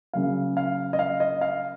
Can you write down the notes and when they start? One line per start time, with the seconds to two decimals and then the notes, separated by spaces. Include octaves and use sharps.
0.13 C#3 F#3 A#3 F5
0.57 F5
0.93 D#5
0.99 F5
1.20 D#5
1.41 F5